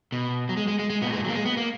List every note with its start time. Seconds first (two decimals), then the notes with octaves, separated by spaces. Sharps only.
0.12 B2
0.49 F#3
0.57 G#3
0.68 G#3
0.79 G#3
0.90 G#3
1.02 A#2 B3
1.13 G#3
1.24 F#3
1.29 A#3
1.35 G#3
1.45 B3
1.57 A#3